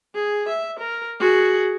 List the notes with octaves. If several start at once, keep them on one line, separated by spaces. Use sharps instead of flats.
G#4
E5
A#4
F#4 G#4